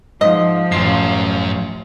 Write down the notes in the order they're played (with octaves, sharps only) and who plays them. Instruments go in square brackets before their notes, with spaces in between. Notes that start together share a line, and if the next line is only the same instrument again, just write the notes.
[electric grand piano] G#2 [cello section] F3 [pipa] D#5
[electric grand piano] A1 C6 C7 [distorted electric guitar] F#2